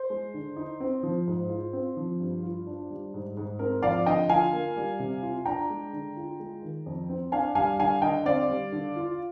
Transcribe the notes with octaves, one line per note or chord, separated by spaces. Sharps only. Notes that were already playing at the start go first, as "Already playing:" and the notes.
Already playing: C5
G#3
D3
D#4
C4
F3
G#2
F4
C4
F3
G2
F4
D4
G3
G#2
G#2
C4 A#4
F3 D5 F5
D3 D#5 G5
F4 F5 G#5
A#3
G3
C3
F4
D4 G5 A#5
G#3
D3
F4
G#3
D#3
F2
C4
D4 F5 G#5
G3 F5 G#5
D3 F5 G#5
D3 D#5 G5
C4 D5 F5
G3
D3
F4